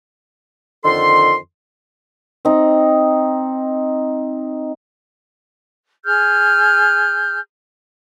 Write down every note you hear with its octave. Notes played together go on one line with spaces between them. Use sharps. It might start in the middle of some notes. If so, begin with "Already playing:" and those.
F2 D3 D#3 A4 C6
C4 D#4
G#4 F6 G6